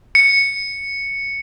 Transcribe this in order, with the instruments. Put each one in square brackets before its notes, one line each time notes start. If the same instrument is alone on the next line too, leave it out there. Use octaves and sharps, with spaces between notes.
[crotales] C#7